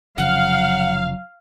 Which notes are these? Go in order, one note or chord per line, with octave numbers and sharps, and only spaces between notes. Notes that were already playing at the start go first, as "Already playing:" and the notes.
F1 C#3 F3 F#3 F5 F#5